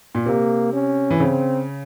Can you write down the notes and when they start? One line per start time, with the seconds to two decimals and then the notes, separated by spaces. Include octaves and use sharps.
0.15 A#2
0.26 C3 A#3
0.73 C#4
1.11 E3
1.20 C#3 C4